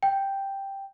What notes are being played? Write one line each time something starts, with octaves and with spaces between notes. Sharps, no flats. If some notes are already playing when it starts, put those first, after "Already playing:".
G5